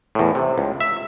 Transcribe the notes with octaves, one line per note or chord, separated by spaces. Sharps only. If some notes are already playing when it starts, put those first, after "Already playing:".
E2 A2
C3
C#2
E5